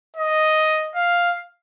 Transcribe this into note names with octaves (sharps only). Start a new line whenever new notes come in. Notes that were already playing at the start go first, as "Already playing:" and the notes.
D#5
F5